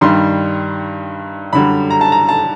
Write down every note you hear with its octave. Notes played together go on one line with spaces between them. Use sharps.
G2 D#3 G3 C6
F#2 D3 G3 B5
A#5
A5
A#5
A5